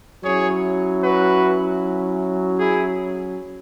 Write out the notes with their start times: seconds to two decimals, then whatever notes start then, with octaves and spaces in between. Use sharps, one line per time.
0.23 F#3 C#4 E4 G#4 C#5
1.02 F#4 B4
2.59 E4 G#4